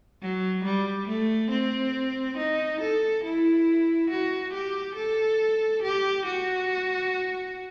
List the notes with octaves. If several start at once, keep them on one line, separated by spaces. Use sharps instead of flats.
F#3
G3
A3
C4
D#4
A4
E4
F#4
G4
A4
G4
F#4